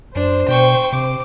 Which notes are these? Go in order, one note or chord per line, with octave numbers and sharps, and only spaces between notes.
F#2 D4 C5
B2 G5 C#6
C3 D6